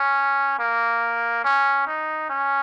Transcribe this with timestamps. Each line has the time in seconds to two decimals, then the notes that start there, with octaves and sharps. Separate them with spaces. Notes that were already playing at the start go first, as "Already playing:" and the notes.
Already playing: C#4
0.59 A#3
1.45 C#4
1.87 D#4
2.30 C#4